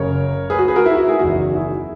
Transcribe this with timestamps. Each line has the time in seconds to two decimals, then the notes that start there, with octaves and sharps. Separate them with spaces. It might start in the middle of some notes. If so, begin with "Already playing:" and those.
Already playing: F#1 F#2 C#3 A#4 C#5
0.50 G#4 B4
0.59 F#4
0.68 G#4 B4
0.76 F#4 A#4
0.86 E4
0.97 F#4
1.08 E4 G#4
1.19 F#1 E2 D#3 F#3 F#4
1.54 E4 G#4